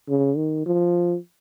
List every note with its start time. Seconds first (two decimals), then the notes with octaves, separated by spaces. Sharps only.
0.09 C#3
0.37 D#3
0.66 F3